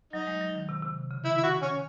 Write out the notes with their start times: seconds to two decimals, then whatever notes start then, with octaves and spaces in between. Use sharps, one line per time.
0.13 F#3 D#4
0.27 G#3
0.41 F#3
0.55 D#3
0.69 C3
0.83 C3
1.11 C#3
1.25 D#3 E4
1.38 E4
1.43 F#4
1.62 C#4